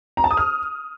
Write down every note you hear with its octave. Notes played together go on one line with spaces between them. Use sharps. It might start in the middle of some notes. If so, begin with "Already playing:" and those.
A#5
A5
D#6
F6